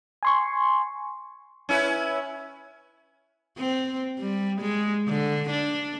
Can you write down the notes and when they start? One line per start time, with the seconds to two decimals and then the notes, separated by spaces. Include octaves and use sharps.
0.23 G#5 C6 C#6
1.69 C#4 E4 B4
3.58 C4
4.20 G3
4.61 G#3
5.08 D3
5.50 D4